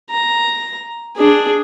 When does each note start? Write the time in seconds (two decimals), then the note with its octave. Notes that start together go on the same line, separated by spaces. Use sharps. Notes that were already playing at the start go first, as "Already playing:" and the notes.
0.10 A#5
1.16 D4 G#4